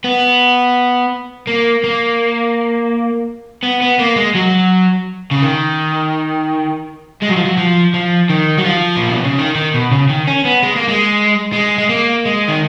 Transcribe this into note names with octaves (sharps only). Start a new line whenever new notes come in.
B3
A#3
A#3
B3
B3
A#3
G#3
F#3
C#3
D#3
G#3
F#3
F3
F#3
F3
F3
D#3
F#3
F3
A#2
B2
C#3
D#3
D#3
B2
C#3
D#3
C#4
B3
G#3
A#3
G#3
G#3
G#3
A#3
G#3
D#3